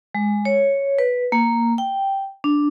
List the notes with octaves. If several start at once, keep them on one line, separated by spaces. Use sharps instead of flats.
G#3
C#5
B4
A#3
G5
D4